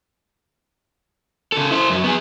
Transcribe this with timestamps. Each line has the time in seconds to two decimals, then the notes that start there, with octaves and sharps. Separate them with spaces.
1.52 C#3 A4
1.71 E4 C5
1.90 F#2 F#3
2.04 B3 G#4